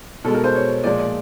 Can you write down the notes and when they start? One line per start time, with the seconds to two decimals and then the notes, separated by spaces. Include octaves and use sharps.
0.24 B2 G#3 A4
0.34 A#4
0.44 C5
0.55 C#5
0.84 A#2 F3 G#3 D5
0.99 D5